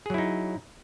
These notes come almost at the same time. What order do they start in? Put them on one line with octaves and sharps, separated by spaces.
G#4 F#3 E4 D#4